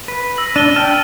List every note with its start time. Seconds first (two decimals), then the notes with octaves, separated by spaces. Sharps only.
0.08 B4
0.37 E6 A#6 F#7
0.56 D4 D#7 G7
0.76 G5 A5 F6